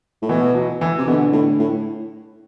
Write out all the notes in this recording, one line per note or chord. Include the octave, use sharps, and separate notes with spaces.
A2
B2 E3
F#3
E3
C3
B2 D3
A2
A2